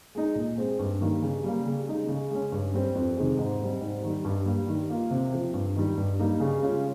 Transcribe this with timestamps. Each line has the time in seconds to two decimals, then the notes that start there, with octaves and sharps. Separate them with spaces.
0.15 G#3 D#4
0.36 A#2
0.58 G#3 C4
0.79 G2
1.01 D#3 G3 A#3
1.22 C#3
1.44 G3 A#3
1.66 C#3
1.87 G#3 D#4
2.09 C#3
2.31 G#3 C#4
2.52 G2
2.74 G3 C4
2.95 F2
3.17 C3 D#3 G#3
3.39 G#2
3.60 G3 C4
3.81 G#2
4.03 D#3 G3
4.25 G2
4.46 G3 A#3
4.68 D#3
4.90 A#3 F4
5.11 C3
5.33 F3 C4
5.54 G2
5.76 D#3 G3
5.98 G2
6.19 G3 A#3 D#4
6.40 C#3
6.62 G#3 C#4 F4